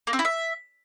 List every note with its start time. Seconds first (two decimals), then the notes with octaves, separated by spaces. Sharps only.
0.07 A#3
0.13 C4
0.19 E4
0.25 E5